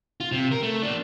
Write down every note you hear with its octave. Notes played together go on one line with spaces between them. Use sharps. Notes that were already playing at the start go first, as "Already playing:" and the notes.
F4
C3
A#4
A3
A#3 D4